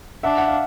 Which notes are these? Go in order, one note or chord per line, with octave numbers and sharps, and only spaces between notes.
D4 E5 F#5
F#5
F5